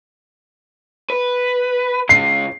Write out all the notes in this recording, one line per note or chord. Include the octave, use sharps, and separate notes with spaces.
B4
C#3 G#3 C7